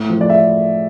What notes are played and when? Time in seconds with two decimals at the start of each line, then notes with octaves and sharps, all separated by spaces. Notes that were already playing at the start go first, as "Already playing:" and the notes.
Already playing: A2
0.10 F3
0.21 D5
0.30 E5